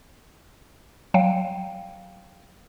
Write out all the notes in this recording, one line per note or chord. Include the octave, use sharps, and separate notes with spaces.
F#3 F5 G5